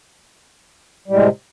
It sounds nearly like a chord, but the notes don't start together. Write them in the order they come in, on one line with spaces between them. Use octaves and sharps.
G3 A2 G#3 C3